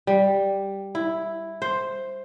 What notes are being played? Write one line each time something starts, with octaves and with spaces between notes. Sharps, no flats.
G3
E4
C5